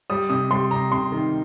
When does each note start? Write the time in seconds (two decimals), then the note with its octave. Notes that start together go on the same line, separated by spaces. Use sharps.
0.10 G3 D#6
0.30 C3 D#6
0.51 G3 C6
0.71 C3 A#5
0.92 C3 C6
1.12 D#3